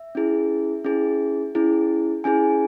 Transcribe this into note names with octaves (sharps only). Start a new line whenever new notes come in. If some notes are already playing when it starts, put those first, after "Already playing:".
Already playing: E5
C#4 E4 G#4
C#4 E4 G#4
C#4 E4 G#4
C#4 E4 G#4 G#5